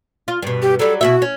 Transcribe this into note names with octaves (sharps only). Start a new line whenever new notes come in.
F4
G2 B2
G4
F#3 G3 A4
B2 E4 F#4 E5
C#4